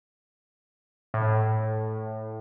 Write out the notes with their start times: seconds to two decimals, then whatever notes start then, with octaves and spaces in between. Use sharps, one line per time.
1.14 A2